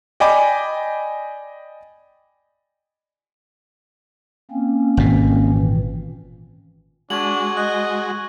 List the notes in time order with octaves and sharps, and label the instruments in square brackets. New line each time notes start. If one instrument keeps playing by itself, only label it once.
[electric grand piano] D5 D#5 G5 G#5 B5 D6
[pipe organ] A#3 C4 C#4
[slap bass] G#1 B2
[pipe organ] A#2 E3
[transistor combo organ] G#3 F#4 [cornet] D4 [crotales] C#6 G#6 F#7
[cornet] D#5 [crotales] F#6 F#7